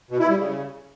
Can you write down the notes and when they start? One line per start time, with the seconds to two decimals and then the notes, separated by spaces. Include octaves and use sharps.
0.11 B2
0.20 E4
0.29 G3
0.37 C#3